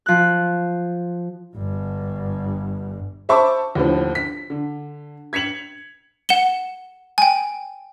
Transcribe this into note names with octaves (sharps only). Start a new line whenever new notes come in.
F3 F#6
G1 G2
C5 E5 A5 B5 C#6 D6
D#2 A2 D3 F3
B6
D3
G#6 B6 C#7 F7 F#7
F#5 E7 G7
G5 G#5